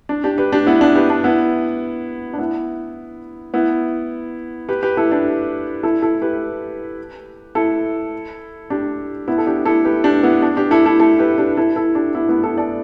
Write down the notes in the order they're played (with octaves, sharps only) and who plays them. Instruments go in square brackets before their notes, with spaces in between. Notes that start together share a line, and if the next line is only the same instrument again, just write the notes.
[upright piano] D4
D4 G4
G4 B4
D4 G4
B3 E4
D4
G4 B4
D4
B3 E4
D4
B3 E4
B3 E4
G4 B4
G4 B4
E4 A4
D4 G4
E4 A4
E4 A4
G4 B4
E4 A4
D4 G4
B3 E4
A4
D4 G4
E4 A4
G4 B4
D4 G4
B3 E4
D4
D4 G4
E4 A4
E4 A4
E4 A4
G4 B4
D4 G4
E4 A4
E4 A4
D4 G4
B3 E4
B3 E4
E4 A4
A4 D5